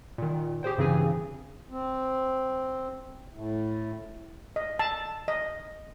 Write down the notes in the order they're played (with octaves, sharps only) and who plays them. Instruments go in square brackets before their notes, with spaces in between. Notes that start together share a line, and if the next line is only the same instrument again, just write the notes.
[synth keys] A#2 D#3
G4 G#4 C5 G5
G2 C#3 E3 C4 G#4 G#5
[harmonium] C4
A2
[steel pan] D#5
A5
D#5